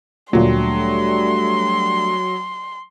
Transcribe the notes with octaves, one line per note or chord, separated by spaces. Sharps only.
D2 A#2 F#3 G3 A3 A#3 D4 C6